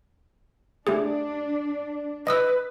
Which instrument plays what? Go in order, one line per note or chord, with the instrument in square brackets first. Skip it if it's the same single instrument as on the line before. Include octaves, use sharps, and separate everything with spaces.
[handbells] A3 G4 G#4 [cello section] D4
[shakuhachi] B4 [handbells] D#5 D#6 E6